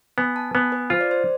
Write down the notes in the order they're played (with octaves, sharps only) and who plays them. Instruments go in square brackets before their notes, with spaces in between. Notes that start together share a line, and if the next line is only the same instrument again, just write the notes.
[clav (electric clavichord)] B3 [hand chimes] G#5
[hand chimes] A5
[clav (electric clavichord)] B3 [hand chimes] G#5
[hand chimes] B4
[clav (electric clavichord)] F4 [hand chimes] C5
[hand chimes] D5
C5